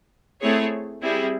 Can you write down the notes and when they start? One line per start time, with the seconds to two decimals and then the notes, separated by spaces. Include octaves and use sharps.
0.41 A3 C4 E4 G#4 C#5
1.02 G3 C4 E4 G#4